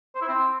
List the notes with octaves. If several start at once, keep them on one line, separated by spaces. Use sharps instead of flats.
C5
E4
C4